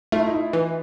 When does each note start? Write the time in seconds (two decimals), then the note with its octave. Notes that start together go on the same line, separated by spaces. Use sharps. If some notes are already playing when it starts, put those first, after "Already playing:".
0.12 A3 F4
0.20 E4
0.27 D#4
0.34 E4
0.53 E3